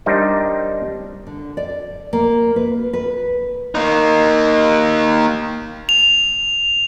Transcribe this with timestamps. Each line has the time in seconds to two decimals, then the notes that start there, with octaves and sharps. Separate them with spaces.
0.06 G3 D4 D#4 A#4 C5
1.27 D3
1.57 D5
2.13 A#3
2.56 B4
2.93 B4
3.75 A#3 D#4
5.89 F7